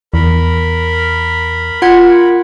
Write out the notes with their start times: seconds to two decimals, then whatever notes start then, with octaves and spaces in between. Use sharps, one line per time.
0.14 E2 A#4 B5
1.82 F4 F#5 G#6